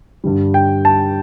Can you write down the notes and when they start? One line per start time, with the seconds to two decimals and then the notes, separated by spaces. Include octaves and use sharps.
0.24 G2 D3 G3
0.54 G5
0.85 A5